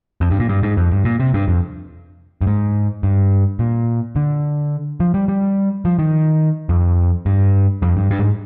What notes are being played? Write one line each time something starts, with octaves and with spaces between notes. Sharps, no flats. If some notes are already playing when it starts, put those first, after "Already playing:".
F2
G2
A#2
G2
G#2
F2
G2
A#2
C3
G2
F2
G2
G#2
G2
A#2
D3
F3
G3
G3
F3
D#3
F2
G2
F2
G2
G2
G#2